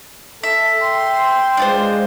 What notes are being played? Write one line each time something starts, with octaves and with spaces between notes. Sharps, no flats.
A4 E5
G5 C6
G#3 D4 F4 C5